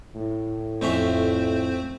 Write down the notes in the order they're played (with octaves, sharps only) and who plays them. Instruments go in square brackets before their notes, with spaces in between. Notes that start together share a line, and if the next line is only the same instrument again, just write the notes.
[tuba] A2
[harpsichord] F2 C#4 E5 [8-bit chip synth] A3 C4 C5